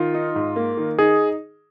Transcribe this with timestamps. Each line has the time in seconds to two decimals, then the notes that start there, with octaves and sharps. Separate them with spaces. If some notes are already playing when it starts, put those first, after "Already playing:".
Already playing: D#3 F4
0.14 D#4
0.35 G#2
0.56 A#3
0.77 D#3
0.99 D#4 G#4